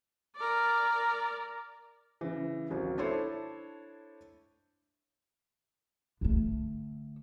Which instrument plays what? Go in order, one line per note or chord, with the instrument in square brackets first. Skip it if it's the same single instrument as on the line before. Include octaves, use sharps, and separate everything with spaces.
[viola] A#4 D5
[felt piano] C#3 E3
G#1 C#2 F#3
D4 E4 A4 C5 C#5
[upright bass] D3 A3